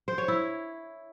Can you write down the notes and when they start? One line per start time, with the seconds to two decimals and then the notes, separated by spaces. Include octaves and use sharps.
0.08 C5
0.18 C#5
0.28 E4